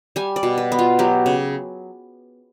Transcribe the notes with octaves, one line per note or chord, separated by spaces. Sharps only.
G3 G#5
D5
B2
B4
B3
F4
F#3 G4
C#3